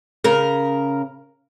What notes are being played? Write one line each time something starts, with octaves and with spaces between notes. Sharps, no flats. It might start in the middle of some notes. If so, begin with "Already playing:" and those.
C#3 A#4